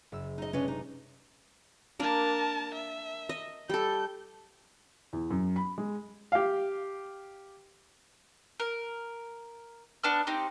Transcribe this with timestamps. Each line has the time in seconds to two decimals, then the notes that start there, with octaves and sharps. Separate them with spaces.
0.12 F#1 E6
0.38 D#4 D#5
0.53 C3 G#3 C#4 D4 B4 D#5
0.68 D#4
2.00 A#3 D4 A#4 A5
2.75 E5
3.29 D#5
3.69 G3 A4 G6
5.13 E2
5.30 F#2
5.56 B5
5.78 G#3
6.32 G4 F5
8.60 A#4
10.04 B3 D4 A5 F6
10.27 C4 D#4 G4